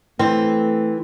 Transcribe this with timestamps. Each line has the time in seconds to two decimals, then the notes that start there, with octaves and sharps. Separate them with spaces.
0.19 E3 A3 C4